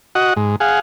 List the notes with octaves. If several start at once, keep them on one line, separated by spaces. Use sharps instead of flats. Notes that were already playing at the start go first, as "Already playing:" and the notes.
F#4 D#5 F#5
G#2
G#4 F5 F#5